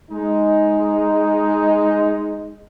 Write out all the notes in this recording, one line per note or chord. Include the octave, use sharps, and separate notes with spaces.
G#3 D#4